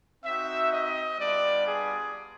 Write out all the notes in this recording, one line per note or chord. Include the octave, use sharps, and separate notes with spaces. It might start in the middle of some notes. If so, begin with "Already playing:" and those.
C4 D#4 F#4 E5
D#5
G3 B3 D4 F4 D5
G#4